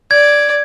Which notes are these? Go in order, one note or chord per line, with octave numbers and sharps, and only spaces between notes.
D5 G#6